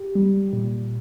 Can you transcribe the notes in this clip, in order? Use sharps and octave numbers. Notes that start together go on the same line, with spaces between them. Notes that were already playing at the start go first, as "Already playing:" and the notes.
Already playing: G4
G3
A#2